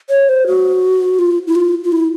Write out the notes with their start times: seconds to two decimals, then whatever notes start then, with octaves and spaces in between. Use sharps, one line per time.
0.10 C#5
0.29 C5
0.47 F#4
1.19 F4
1.47 E4
1.55 F4
1.84 F4
1.92 E4